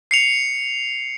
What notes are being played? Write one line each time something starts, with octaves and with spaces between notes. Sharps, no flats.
C7 C#7 F7